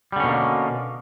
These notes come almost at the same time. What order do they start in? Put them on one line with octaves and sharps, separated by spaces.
G3 D3 C#4 B2 A#3